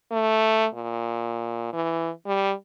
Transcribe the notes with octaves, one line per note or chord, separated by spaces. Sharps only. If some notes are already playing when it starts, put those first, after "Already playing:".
A3
A#2
E3
G3